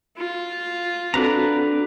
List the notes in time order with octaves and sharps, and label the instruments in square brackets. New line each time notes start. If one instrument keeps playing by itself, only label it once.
[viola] F4
[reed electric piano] C4 F#4 A4 [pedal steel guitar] D4 B4 A#5